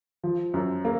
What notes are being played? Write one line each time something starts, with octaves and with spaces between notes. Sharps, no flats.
F3
F#2
A#3